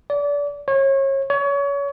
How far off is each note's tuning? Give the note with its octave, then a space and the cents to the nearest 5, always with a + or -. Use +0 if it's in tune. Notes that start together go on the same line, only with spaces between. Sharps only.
D5 -30
C#5 -30
C#5 +30